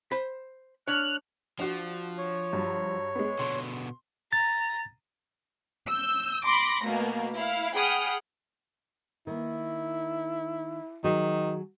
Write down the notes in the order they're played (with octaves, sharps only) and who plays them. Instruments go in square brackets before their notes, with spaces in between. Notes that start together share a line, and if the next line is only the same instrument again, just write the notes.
[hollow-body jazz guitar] C5 B5
[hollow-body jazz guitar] D4 C#5 [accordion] F6 F#6
[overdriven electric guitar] F3 [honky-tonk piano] D4 F#4
[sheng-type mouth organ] C#5
[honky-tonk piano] G2 F#3
G#3 B3
[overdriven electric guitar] B2 D3 [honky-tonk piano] C6
[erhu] A#5 [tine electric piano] A6
[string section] E6 G6
B5 C6 D6 A#6
B2 A3 A#3
E4 F5
G#4 F#5 G5 B5 D#6 F6
[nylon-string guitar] D#3 A#3 [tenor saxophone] E4
[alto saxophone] D#3 [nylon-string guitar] F#3 F#4 G#4